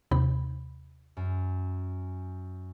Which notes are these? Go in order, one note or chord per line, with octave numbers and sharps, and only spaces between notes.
D#2 C3 B5
F#2